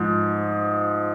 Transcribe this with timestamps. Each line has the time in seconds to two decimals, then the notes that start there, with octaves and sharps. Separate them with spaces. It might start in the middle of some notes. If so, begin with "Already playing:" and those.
Already playing: G#2 F3